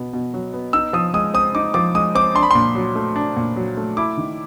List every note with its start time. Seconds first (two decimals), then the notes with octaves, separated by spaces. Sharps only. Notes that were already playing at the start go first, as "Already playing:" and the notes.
Already playing: B2 B3
0.13 B2
0.34 F#3
0.53 B3
0.73 D#4 E6
0.93 F3 D#6
1.14 G#3 D#6
1.34 C4 D#6
1.55 D#4 D6
1.74 F3 D6
1.95 G#3 D#6
2.15 C4 D6
2.35 D4 C6
2.43 B5
2.51 A#2 C6
2.75 F#3
2.95 A3
3.16 D4
3.37 A#2
3.56 F#3
3.77 A3
3.97 E4 D6
4.17 D#3